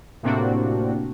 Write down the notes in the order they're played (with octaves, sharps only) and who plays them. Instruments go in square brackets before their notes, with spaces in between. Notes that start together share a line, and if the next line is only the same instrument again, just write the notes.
[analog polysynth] A2 C3 A#3 C4 D4 F#4